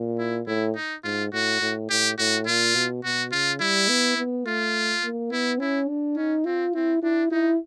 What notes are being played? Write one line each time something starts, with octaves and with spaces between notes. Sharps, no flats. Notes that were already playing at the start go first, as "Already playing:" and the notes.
Already playing: A#2
E4
A2 E4
D#4
G#2 F4
A2 F#4
A2
A2 G4
A2 F#4
A#2 F4
B2
B2 F#4
C#3 F4
G3 E4
B3
B3
A3 F4
A#3
B3 E4
C#4 E4
D4
C#4 D#4
C4 F4
C4 E4
D4 E4
D#4 E4